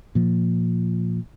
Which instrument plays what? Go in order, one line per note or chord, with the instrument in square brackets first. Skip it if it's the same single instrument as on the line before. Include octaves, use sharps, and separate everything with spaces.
[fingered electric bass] A#2 F3